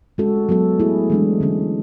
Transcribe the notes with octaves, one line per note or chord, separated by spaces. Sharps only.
G#3 C#4 F#4 A4
F#3 B3 F#4 A4
A3 E4 G#4
E3 G#3 D4
D3 F#3 C#4